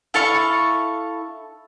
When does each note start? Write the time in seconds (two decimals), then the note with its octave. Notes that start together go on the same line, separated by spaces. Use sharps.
0.14 E4 A4 F5 C#6